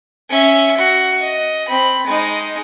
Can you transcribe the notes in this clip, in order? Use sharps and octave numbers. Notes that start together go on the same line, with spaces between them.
C#4 E5
F#4
D#5
C4 B5
G#3 D#4